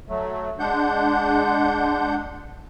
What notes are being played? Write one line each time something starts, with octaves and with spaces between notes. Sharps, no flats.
F#3 A3
G#3 D4 F#5 G6